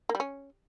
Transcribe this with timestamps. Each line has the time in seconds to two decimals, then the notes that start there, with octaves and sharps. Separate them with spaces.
0.09 A#3
0.15 G3
0.20 C#4